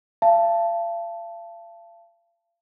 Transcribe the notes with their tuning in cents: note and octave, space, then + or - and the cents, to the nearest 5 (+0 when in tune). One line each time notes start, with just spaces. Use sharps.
F5 -40 A5 +0